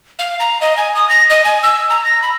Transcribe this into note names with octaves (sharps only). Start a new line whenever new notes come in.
F5
A#5
D#5
G#5
D#6
A#6
D#5
G#5
E6
A#5
A#6
B5